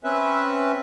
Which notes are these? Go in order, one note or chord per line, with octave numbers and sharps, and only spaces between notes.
C4 C#4 B4 E5